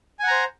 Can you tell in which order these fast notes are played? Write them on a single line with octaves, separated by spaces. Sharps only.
G#5 F#5 A#5 C5